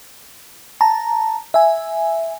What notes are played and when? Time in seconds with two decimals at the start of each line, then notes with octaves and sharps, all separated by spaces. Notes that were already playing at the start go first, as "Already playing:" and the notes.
0.81 A5 A#5
1.54 E5 G#5